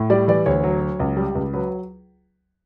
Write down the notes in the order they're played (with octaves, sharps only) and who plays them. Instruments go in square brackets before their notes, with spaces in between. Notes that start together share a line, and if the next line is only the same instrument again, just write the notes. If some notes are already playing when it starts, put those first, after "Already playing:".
Already playing: [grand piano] A2
G3 D5
E3 D5
D2 C#5
F#3
F#3
C#2
G3
C#2
F#3 B4